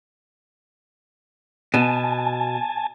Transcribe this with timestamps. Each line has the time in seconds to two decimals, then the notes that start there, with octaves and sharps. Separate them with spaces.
1.74 B2 G#5 A5